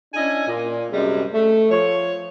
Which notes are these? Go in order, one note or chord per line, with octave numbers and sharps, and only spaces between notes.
C#4 D4 E4 D#5 G#5
A#2
F#2 C3 G3 G#3
A3
F3 C#5